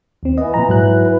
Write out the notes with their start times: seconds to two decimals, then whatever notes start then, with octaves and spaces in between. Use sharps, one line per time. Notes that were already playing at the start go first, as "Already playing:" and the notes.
0.23 D#2 C4
0.38 E3 B3 D#5
0.54 A#2 F3 A#5
0.68 G#2 F#3 F#6
1.05 B4